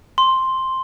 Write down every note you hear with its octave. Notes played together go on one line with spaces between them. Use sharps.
C6